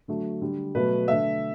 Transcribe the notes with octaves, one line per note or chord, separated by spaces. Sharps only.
D3 F#3 A3
D3 G3
B2 F#3 A3 B4
D3 A3 E5